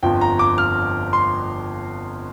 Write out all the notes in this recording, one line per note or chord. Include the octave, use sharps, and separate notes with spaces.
G1 F2 F3 G5
A#5
D6
F6
C6